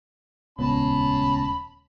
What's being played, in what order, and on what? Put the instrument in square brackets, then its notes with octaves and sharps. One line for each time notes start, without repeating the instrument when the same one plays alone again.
[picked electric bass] D#1 [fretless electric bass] C#2 B3 [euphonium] C#4 [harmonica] A5 B5